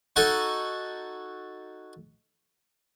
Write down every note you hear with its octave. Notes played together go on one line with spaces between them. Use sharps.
D#4 F#4 A4 G#5